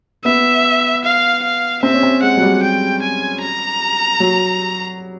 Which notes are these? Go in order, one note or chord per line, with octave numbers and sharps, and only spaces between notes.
B3 E5
F5
F5
C4 E5
C#4
C4
G#3 F#5
F#3
G3
G5
G#5
A#5
F#3